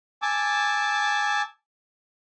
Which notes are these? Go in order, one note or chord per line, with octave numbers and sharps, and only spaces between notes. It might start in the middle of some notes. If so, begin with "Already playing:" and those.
G#5 A5 D6 E6